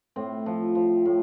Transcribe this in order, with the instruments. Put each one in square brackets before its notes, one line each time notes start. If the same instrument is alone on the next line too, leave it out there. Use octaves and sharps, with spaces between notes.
[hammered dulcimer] A2 C4
F3
F3
A2